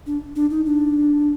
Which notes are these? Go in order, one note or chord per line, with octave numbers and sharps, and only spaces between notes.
D4
D4
D#4
D4